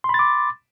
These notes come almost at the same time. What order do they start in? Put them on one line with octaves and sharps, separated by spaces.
C6 B5 A6 D6